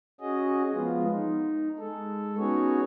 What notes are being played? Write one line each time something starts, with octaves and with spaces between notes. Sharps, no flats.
C#4 F#4 G#4 D#5
F3 G#3 B3 F4
D#4
G#3 A4
B3 C#4 D#4 F#4 G#4 C#5